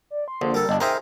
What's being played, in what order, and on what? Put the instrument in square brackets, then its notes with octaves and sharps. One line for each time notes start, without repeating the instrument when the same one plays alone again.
[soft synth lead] D5
C6
[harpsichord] A#1 [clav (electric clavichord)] D3
[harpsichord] G3 A4 [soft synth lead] A#4
[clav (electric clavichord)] G1 D4 [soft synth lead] D#5
[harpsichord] D#4 G#4 F5 [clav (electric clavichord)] A#4 C5 E5 [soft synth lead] G5